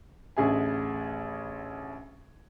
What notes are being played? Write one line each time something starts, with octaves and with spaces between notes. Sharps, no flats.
A1 D2 G#4 E5 G#5